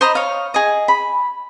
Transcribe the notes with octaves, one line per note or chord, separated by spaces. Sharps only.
C5 D#5 A#5 B5
C#5 F5
G#4 D#5
B5